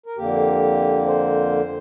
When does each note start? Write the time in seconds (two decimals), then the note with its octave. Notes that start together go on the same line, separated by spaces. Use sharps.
0.06 A#4
0.17 F2 D3 A#3 G4
1.07 C5